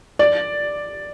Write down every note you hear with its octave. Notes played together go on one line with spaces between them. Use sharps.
D5